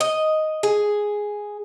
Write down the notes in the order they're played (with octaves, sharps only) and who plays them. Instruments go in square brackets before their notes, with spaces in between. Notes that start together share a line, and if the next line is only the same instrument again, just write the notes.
[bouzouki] D#5
G#4